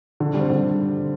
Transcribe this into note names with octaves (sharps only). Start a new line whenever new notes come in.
D3
G3
C4
D3